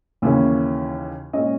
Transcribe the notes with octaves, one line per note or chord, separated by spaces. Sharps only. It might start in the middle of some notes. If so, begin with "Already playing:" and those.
D#2 C#3 E3 A#3 C#4
A#2 G#3 C#4 D#5